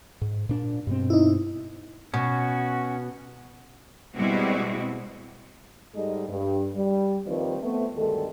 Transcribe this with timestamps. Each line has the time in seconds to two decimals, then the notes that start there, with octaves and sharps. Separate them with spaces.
0.22 G#2
0.49 A#2 D4
0.87 G2 B2 C4
1.10 D#4 E4
2.14 B2 C#4 F#4
4.15 B2 G3 G#3 C4 E4 F#4
5.95 G#2 G3 G#3 D#4 A4 D#5
6.29 G2
6.76 G3
7.26 D#2 D#3 F3 G3 C4 B4
7.61 A3 B3 C4
7.96 D2 G2 D#3 G#3 A4